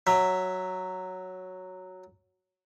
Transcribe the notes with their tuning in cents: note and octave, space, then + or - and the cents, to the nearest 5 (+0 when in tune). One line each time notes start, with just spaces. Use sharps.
F#3 +0 E5 +0